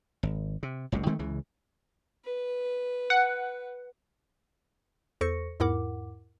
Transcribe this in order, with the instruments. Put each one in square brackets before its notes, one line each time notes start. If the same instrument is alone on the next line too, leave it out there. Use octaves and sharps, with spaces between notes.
[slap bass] G#1
C3
F#1 C#2 C3
D#3 G#3 A3 C4
C#2 C#3 E3
[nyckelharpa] B4
[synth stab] F#5
[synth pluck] E2 A4 C5 C#6 A#6 C#7
E2 G#2 E4 A#4 F#5 D6